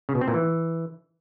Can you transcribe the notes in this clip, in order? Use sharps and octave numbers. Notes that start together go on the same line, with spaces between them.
C#3
B2
C4
A#2
E3